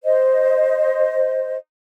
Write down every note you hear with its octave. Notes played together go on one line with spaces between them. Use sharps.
C5 D#5